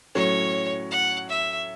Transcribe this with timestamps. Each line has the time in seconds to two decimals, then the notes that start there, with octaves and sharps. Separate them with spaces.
0.15 A2 F#3 C#4 C#5
0.91 F#5
1.29 E5